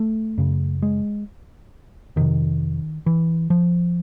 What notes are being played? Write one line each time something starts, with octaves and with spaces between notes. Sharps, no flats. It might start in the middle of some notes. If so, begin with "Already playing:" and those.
Already playing: A3
F#2 C#3
G#3
F2 C3 D#3
E3
F3